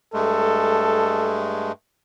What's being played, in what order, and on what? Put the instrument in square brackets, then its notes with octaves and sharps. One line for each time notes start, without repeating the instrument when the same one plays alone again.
[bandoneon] G2 G#3 A3 [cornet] A4